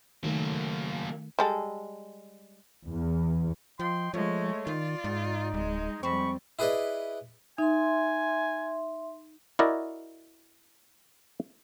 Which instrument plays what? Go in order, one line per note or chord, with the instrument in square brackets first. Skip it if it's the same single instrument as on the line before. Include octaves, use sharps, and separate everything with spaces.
[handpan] D#3 A3 [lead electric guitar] F#3 A#3
[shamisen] G3 G#3 A4
[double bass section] E2
[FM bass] F3 [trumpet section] D#5 G5 C6
[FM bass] F3 [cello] G#3 [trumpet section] A3 C#5
[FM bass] D#3 [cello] F4 D5
[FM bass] G#2 [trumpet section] D#4
[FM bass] D1 [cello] G#3
[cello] F2 G3 [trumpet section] G#3 B5 C#6 [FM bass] C4
[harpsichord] E4 G#4 B4 D5 D#5
[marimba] D#4 [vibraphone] E5 C6 [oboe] G#5
[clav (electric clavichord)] E4 F#4 A#4 D5 D#5